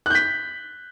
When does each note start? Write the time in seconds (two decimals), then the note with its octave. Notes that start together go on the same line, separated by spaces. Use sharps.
0.06 F#6
0.10 G6
0.15 B6